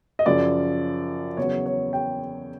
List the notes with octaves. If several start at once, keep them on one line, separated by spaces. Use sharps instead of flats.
D#5
F#2 C#3 F3 D5
E2 C#3 F#3 C#5
C#5
G5